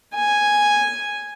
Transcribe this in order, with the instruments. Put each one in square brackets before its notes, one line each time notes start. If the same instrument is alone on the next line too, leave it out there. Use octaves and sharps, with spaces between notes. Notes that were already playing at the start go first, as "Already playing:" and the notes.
[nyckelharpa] G#5